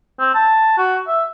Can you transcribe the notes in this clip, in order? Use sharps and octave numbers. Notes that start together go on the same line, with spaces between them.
C4
A5
F#4
E5